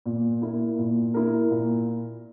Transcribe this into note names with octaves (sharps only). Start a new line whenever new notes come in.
A#2
A#3 E4 A#4
A#2
A#3 E4 A#4
A#2